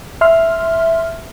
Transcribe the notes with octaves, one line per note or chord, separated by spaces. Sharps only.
E5 C6 F6